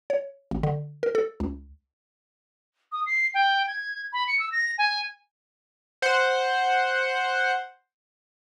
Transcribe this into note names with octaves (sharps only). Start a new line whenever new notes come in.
C#5
G#1
D3
A#4
A4
C#2
D#6
C7
G5
G#6
B5
C#7
E6
A#6
G#5
C5 F#5